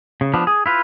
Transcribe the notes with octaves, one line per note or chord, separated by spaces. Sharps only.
C#3
F3 B3 D4
G#4
E4 F4 B4